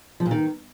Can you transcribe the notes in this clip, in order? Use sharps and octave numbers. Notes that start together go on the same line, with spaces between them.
F3
A#2
D#3